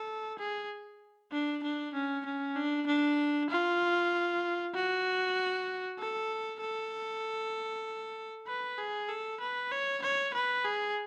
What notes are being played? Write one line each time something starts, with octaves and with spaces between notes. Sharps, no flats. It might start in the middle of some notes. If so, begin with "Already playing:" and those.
Already playing: A4
G#4
D4
D4
C#4
C#4
D4
D4
F4
F#4
A4
A4
B4
G#4
A4
B4
C#5
C#5
B4
G#4